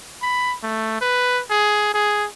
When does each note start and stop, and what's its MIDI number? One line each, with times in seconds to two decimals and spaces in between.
0.22 0.56 83
0.63 1.01 57
1.01 1.41 71
1.50 1.90 68
1.94 2.26 68